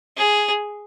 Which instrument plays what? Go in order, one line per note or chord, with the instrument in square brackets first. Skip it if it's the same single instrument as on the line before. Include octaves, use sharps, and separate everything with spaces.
[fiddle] G#4